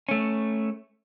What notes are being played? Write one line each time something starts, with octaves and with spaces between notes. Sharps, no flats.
A3 C#4